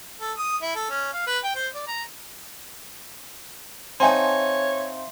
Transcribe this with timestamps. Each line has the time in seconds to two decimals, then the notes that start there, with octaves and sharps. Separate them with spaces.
0.21 A4
0.37 D#6
0.62 E4
0.75 A4
0.90 C#4
1.13 F5
1.27 B4
1.44 G5
1.55 C5
1.74 D5
1.87 A#5
4.00 C4 D#4 C#5 E5 F5 G#5 A5 C6